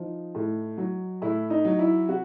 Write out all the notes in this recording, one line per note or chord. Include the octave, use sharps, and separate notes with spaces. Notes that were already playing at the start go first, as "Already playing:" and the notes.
Already playing: F3 D#4
A2
F#3
A2 E4
D#4
F#3
E4
C3 F#4